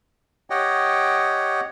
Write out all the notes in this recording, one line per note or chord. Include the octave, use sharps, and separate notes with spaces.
G4 C#5 D#5 F#5 G5